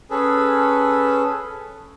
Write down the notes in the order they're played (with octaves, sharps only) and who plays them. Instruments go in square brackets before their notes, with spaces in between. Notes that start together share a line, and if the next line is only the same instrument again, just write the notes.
[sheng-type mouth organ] C#4 G#4 A4 B4